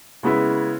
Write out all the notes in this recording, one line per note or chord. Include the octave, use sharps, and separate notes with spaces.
C#3 G#3 B3 E4